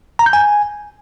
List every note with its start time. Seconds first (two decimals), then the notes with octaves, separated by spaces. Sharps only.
0.19 A#5
0.26 G6
0.33 G#5